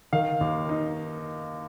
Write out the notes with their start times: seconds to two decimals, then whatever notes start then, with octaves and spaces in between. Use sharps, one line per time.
0.13 D#3 F5
0.41 D#2
0.69 D#4